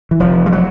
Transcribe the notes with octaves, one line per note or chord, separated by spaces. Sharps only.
E3
F1 F3
G3
F#3